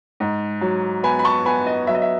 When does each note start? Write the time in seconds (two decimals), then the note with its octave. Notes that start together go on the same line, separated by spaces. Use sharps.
0.20 G#2
0.61 F#3
1.03 B3 G#5 B5
1.19 B5
1.24 A5 C#6
1.45 B3 G#5 B5
1.67 D#5
1.87 F#3 E5
1.95 D#5
2.02 E5